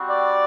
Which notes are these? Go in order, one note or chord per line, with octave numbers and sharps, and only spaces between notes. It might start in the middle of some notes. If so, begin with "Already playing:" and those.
Already playing: G3 C4 F#4
D5